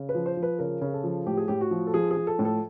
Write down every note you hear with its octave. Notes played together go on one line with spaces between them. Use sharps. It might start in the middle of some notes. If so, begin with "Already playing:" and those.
Already playing: C#3
B4
F3
C5
F3
B4
C#3 A#4
C#3
A4
F3
A2 G4
G#4
A2 G4
F#4
F3
A4
F3 G#4
G#4
F3
A4
A2
A4